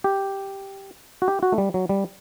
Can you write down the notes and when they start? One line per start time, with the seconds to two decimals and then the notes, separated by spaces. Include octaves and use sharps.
0.04 G4
1.22 F#4
1.28 G4
1.43 F#4
1.52 A3
1.58 G3
1.74 F#3
1.89 G3